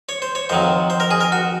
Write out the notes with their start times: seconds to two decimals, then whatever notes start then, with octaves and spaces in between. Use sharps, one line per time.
0.09 C#5
0.22 C5
0.35 C#5
0.49 F2 D#3 F#3 C5
0.90 C5
1.00 A#4
1.11 G#4
1.21 A#4
1.32 F#4